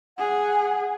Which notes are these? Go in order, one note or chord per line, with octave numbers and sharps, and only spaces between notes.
G#4 F#5